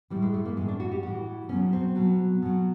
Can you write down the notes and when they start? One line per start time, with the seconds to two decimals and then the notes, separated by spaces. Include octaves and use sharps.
0.10 A2 E3 G3
0.22 G#3
0.34 A3
0.45 A#3
0.57 A2 E3 G#3
0.68 D4
0.80 F#4
0.92 G4
1.03 A2 E3 F#4
1.49 B2 C#4
1.53 F#3
1.73 C4
1.95 B2 F#3
2.42 B2 F#3